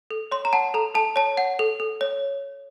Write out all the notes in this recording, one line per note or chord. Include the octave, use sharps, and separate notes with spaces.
A4
C#5 C6
A#5
F#5 A5
A4 A#5
A4 A5
C#5 A5
F#5
A4
A4
C#5